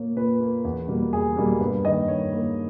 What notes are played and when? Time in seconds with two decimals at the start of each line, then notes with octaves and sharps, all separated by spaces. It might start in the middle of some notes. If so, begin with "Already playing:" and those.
Already playing: A#2 A#3 C#5
0.16 A#2 B4
0.41 A#3
0.64 E2
0.88 B2 G3 A#3
1.12 E2 G#4
1.36 B2 G3 A#3
1.60 G2 B4
1.85 D#3 A#3 D#5
2.08 G2 C#5
2.33 D#3 A#3